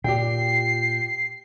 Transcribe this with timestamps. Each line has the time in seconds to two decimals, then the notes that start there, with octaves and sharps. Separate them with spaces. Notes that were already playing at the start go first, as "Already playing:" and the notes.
0.04 A#2 G4 G5 C7